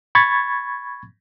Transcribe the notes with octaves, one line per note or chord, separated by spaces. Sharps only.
B5 C#6 G#6 A6